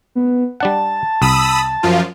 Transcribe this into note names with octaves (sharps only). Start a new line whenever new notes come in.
B3
G3 D4 F#5 A5
C2 B5 D#6 E6
F#2 F3 F4